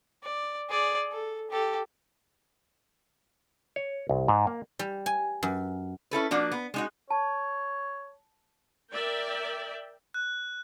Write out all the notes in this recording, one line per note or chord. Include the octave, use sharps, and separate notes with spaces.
D5
G#4 D5
A4
G4 A4
C#5
C2
G#2
A#3
G3
G#5
F#2
C#4 E4 A4 B4
F3 A#3 D4 F#4
B3
G#3 D#4 F#4
C#5 A5
A#4 D5 E5 G5
F#6